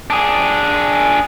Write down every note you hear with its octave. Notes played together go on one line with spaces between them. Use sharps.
D4 G#4